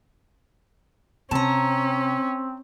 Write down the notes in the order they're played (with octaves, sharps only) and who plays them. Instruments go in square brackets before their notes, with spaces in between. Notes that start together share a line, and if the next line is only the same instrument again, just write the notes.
[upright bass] C3 [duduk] C4 [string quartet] C#4 [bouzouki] A5 A#5